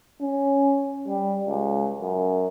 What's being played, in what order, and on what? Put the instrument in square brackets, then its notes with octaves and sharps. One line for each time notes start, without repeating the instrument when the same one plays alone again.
[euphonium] C#4
G3
C#2
F#2